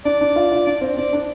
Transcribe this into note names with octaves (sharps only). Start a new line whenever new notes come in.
D4 D5
D4
F4
F4
D4
C4
C4 D5
D4